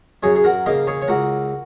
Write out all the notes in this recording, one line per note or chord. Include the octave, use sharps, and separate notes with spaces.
F#2 G#4 C#5
G#4
F#4 A#4
C#3 A#3 A#4 D#5
G#4 C#5
C#5
C#2 F#4 A#4